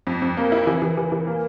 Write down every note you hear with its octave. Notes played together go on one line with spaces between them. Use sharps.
F2
F2
A#3
E4
E3
E3
E3
E3
A#3